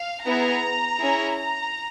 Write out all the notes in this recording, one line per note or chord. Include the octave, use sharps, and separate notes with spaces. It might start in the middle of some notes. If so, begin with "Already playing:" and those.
Already playing: F5
B3 E4 G#4 A#5
C#4 E4 G#4
A#5